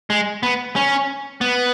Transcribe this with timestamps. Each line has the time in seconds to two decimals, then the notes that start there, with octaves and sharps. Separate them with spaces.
0.10 G#3
0.43 B3
0.76 C#4
1.41 B3